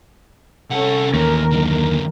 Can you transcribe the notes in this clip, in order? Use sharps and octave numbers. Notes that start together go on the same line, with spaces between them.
C2 C#4 A4 F#5
D#2 E3 A3 A#4
F#2 D3